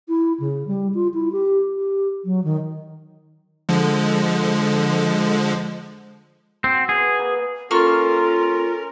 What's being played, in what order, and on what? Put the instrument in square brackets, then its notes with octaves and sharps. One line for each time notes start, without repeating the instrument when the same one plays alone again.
[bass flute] E4
C#3
G3
F4
E4
G4
G4
F#3
D#3
[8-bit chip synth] D3 F3 G#3
[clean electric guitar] C4 [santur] F#4
[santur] B3 C#5 [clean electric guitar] G#4
[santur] A#3 B4 D#5
[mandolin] A#3 C#6 F6 [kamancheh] C#4 A#4 [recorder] F4 [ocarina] A4